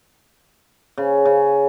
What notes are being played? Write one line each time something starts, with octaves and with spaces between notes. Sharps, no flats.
C#3
C#3